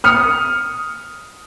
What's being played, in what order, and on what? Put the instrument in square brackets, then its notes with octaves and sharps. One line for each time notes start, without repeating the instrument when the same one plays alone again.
[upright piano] D#6 F6 C#7